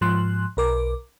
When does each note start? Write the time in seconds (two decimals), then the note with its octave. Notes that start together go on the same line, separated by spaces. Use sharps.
0.01 G#2 F3 C6 F#6
0.57 B1 A#4 D6